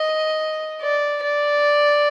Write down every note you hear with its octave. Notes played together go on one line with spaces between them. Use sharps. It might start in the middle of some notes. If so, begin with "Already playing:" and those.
Already playing: D#5
D5
D5